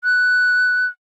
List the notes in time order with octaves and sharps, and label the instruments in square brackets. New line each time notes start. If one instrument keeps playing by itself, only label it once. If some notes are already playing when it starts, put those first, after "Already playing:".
[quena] F#6